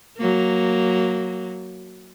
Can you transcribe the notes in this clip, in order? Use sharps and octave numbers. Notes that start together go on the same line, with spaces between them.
F#3 A#3